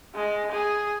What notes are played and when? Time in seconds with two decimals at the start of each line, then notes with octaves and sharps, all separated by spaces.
0.15 G#3
0.51 G#4